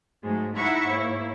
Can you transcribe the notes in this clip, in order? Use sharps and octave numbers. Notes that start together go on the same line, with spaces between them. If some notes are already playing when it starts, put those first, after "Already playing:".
G#2 F#3 G#3 A3
D#4 E4 E5 F#5 B5 C#6
G#2 A#3 E4 C#5